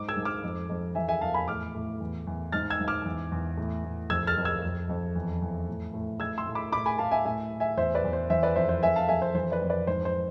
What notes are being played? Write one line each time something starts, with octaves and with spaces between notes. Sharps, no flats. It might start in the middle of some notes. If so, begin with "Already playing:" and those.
Already playing: G#2 D6
E6 G#6
G#2
D6 F6
F2
F2
E3 E5 G#5
E5 G#5
E2 F5 A5
G#5 B5
A2 D6 F6
A2
E2
E2
G#2 F6 A6
E6 G#6
G#2
D6 F6
E2
E2
A2
A2
F2 E6 G#6
F6 A6
F2
E6 G#6
F2
F2
E2
E2
A2
A2
A2 E6 G#6
C6 E6
A2
B5 D6
A2 B5 D6
G#5 B5
A2 F5 A5
E5 G#5
A2 E5 G#5
A2
E5 G#5
E2 C5 E5
B4 D5
E2
C5
E3 C5 E5
B4 D5
F2 C5 E5
C5 E5
F2 E5 G#5
F5 A5
F2 E5 G#5
C5
E3 C5
B4 D5
F2
B4 D5
G#2 C5
C5